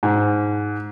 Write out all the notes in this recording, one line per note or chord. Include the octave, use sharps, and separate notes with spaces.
G#2